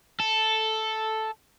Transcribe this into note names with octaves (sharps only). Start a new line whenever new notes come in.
A4